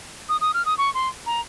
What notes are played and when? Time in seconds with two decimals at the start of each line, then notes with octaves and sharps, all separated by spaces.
0.29 D#6
0.41 D#6
0.54 F6
0.66 D#6
0.78 C#6
0.94 C6
1.26 A#5